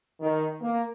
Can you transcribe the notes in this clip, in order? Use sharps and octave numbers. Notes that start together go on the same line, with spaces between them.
D#3
A#3